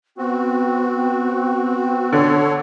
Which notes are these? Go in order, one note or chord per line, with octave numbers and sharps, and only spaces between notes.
B3 C4 F#4
D3 A4 C#5